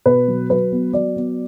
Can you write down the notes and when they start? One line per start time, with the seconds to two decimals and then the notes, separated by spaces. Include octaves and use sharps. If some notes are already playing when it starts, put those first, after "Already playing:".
0.06 B2 B4
0.28 F#3
0.50 F#3 B4
0.72 B3
0.93 F#3 D5
1.16 B3